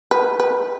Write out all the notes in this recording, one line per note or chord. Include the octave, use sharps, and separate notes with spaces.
B4
B4